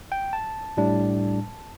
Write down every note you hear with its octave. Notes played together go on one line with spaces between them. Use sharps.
G5
A5
A2 G3 D4